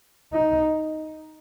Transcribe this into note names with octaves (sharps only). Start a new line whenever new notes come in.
D#4